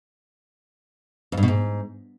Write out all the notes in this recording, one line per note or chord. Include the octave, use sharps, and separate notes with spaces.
F2
G2
B2
G#2